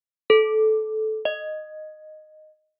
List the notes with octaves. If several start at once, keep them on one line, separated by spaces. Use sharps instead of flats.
A4
D#5